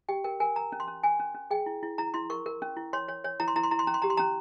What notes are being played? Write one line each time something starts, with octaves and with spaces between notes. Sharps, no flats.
G4 G5
A#4 G5
A#4 G#5
A#4 A#5
C#4
C6
C#4
C#4 G#5
C#4
C#4
G#4 G5
E4
E4
E4 A#5
E4 C6
A#4 C#6
A#4
C#4
E4
C#5 C6
C#5
C#5
E4 A#5
C6
E4 A#5
C6
E4 A#5
C6
C#4 A#5
C6
G4 A#5
C6
C#4 A#5